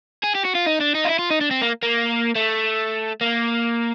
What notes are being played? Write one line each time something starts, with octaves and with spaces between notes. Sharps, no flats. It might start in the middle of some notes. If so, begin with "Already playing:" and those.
G#4
G4
F#4
F4
D#4
D4
D#4
F4
E4
F4
D#4
D4
C4
A#3
A#3
A3
A#3